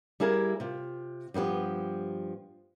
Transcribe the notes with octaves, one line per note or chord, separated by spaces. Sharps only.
G3 E4 G#4 A#4 F5
C3 F4
G2 F3 B3 G4